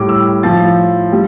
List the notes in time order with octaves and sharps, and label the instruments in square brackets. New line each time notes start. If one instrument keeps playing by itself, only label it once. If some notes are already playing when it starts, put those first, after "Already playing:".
Already playing: [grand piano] A2 G3 D6
E6
A2 F3 A6
G3